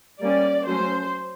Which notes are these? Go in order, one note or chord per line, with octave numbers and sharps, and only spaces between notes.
G3 A#3 C#4 D5
F#3 A3 C#4 C5